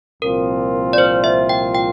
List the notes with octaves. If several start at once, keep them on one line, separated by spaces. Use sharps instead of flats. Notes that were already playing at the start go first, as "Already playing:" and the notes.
C2 A#2 F3 C4 F4 A#4
D5
C5
E5
G5
G5